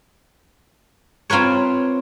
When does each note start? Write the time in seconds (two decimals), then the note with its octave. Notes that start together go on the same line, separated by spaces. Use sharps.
1.30 C4 F4 A#4 B4 C#5